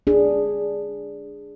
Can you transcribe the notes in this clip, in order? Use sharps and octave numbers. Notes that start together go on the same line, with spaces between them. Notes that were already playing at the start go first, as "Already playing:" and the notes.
D4 G#4